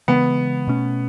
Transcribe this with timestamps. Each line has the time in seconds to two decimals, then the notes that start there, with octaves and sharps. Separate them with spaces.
0.08 C#3 E3 G#3 B3
0.67 B2 A3 C#4